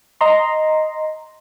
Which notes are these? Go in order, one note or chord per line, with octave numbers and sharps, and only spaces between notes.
D#5 A#5 C6